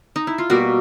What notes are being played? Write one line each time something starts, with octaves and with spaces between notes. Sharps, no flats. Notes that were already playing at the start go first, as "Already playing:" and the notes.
D#4
E4
F4
B2 G3 A#3 F#4